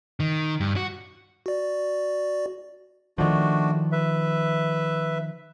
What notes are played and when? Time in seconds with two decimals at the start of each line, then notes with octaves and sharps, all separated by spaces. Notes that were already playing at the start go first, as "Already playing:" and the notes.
0.20 D#3
0.60 G2
0.76 F#4
1.46 F#4 D5
3.18 D#3 F3 A3 D4 F#4
3.92 B4 E5